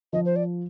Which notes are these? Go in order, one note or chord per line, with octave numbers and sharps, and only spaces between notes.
F3 D#5
C5
D5